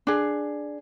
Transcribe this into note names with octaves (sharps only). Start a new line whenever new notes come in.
D4 G#4